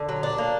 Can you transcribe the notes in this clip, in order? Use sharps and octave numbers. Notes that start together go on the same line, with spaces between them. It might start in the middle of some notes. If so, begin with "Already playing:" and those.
Already playing: D3
F#3
D4
A#3